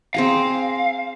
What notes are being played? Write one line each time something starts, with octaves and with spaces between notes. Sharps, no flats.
C4 G#4 F5 A#5